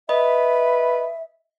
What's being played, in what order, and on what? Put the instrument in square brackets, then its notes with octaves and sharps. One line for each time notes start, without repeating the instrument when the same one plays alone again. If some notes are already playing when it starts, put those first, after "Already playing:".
[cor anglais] B4 [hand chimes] D#5 [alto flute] E5